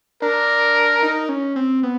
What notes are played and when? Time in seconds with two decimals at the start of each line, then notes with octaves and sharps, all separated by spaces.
0.22 D4 A#4
1.03 D#4
1.29 C#4
1.56 C4
1.83 B3